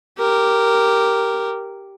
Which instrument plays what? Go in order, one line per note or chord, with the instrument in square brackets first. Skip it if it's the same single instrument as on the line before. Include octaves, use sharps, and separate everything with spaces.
[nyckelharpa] G4 A#4